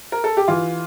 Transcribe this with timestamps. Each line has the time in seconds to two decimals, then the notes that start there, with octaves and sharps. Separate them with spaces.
0.12 A#4
0.24 A4
0.37 G4
0.48 E3 F4